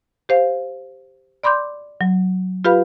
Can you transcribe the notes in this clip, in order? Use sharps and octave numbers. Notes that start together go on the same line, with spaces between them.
G4 C5 F5
D5 B5 C6 D6 G6
F#3
F4 G4 B4 F5 B5